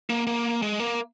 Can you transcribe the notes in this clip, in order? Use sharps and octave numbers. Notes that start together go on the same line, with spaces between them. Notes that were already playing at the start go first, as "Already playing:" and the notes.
A#3
A#3
G#3
A#3